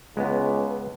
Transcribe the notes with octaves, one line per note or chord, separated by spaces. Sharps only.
C#2 G#3 B3